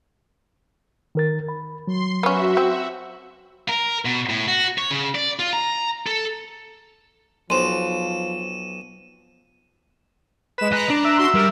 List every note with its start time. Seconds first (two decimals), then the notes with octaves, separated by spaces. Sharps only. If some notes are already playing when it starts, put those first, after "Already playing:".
1.15 D#3 A#4 A6
1.49 B5
1.87 F#3 C6
2.23 B3 C#4 F#4 E5
2.57 C4
3.69 A#4
4.05 B2
4.29 A2
4.48 F#4
4.78 C#5
4.91 C#3
5.15 D5
5.39 F4
5.53 A#5
6.07 A4
7.50 B1 F3 C5 C6 D#7 E7
10.58 G#3 B4 E7
10.72 G#4 D#5 A#5 F#6
10.89 D4
11.05 E5
11.17 F#4 C6
11.35 G3 A#4